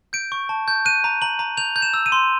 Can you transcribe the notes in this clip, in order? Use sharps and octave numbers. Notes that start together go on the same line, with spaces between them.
G6 D7
C#6
A5
G6
F#6 D#7
A#5
A#5 F#7
A#5
G6 F7
G6
E7
E6
D#7
C6